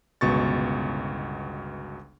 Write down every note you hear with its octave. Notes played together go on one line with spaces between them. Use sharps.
G1 C#2 B2 C#6 A6